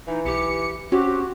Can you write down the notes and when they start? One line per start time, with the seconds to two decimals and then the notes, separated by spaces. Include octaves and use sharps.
0.08 E3 D#4
0.25 B1 G4 C#7
0.92 C4 C#4 F#4 G4